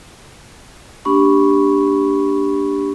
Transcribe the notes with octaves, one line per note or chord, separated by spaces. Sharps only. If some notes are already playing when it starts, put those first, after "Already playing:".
A#3 D4 G4 B5 C#6